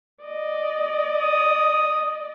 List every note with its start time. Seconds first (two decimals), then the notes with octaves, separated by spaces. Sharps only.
0.24 D5 D#5
1.15 D#6